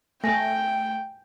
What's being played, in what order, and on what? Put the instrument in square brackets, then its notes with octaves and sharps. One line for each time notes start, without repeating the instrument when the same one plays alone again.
[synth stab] A3 [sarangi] G5 [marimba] G#5 A#6